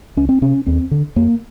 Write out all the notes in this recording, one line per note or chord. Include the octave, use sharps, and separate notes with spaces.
C#2 C#4
C4
C3 C#4
D#2 C4
D3
F2 A#3